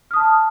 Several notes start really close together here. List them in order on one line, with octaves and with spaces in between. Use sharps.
F6 D#6 A5